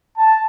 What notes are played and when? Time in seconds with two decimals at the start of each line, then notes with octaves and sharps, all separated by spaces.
0.18 A5